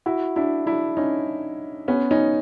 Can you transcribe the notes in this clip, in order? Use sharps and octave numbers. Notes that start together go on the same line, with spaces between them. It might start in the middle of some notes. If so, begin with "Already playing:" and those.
E4 F#4
D4 E4
D4 E4
C#4 D#4
B3 C#4
C#4 D#4